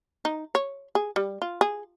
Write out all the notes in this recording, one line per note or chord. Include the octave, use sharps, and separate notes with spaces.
D#4
C#5
G#4
G3
F4
G#4